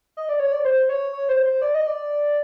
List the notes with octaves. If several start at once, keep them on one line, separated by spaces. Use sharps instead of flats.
D#5
D5
C#5
D5
C5
C#5
C#5
C5
C5
D5
D#5
D5